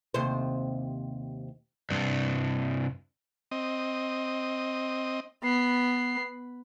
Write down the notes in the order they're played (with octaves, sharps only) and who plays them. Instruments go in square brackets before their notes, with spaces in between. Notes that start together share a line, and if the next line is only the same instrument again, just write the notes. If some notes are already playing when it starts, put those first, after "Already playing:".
[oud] D#2 C3 C5
[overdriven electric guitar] C2 G2
[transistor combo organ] C4 D#5
[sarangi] B3 [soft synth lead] C7